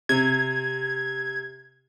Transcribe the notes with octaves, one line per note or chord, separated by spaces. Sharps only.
C3 G#6